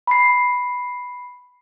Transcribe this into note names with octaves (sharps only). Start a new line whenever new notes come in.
B5 C7